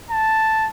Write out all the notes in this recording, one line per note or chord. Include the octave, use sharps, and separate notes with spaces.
A5